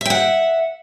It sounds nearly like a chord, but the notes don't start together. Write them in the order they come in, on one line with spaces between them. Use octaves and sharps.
E5 G5 F#5